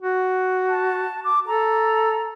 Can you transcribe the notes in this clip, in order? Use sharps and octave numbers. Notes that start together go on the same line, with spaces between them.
F#4
A5
D6
A4 A#5